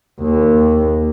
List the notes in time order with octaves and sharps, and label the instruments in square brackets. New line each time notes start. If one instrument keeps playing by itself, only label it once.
[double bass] D#2